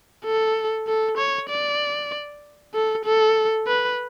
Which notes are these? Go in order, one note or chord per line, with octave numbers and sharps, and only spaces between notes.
A4
A4
C#5
D5
A4
A4
B4